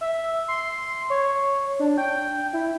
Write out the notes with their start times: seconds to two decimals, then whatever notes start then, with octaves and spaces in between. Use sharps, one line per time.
0.01 E5
0.48 C6
1.10 C#5
1.79 D4
1.98 G5
2.53 E4